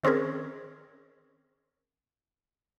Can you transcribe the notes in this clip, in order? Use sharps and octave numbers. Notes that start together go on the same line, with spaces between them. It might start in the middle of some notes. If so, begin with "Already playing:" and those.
D#3 C4 C#4 G#4 A#4